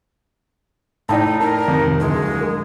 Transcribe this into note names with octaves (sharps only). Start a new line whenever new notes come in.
A2 D#4 D5 G5 A5
A#4 A5
F2 C3 D#3
D1 G#3
A#4